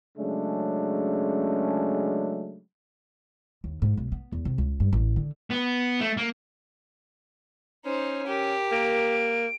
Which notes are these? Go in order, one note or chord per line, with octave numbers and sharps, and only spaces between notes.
C#3 F#3 G#3 A3 C#4 D4
D#2
G#2
B1
B3
E2
C3
C#2
G2
A1
D3
B3
A3
A#3
C#4 D#4 C5
G4 A#4
A#3 D7